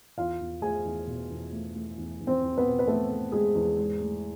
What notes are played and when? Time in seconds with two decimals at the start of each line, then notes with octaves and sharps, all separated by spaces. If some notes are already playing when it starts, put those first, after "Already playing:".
0.18 E2 F4 F5
0.40 E2
0.62 A3 G#4 G#5
0.85 E2
1.07 B2
1.30 E2
1.53 A3
1.75 A3
1.98 E2
2.20 E2
2.27 C4 C5
2.43 E2
2.58 B3 B4
2.65 B2
2.79 B4
2.87 A3 A4
3.10 A3
3.32 G#3 A3 G#4
3.55 E2
3.78 G#2
4.00 A3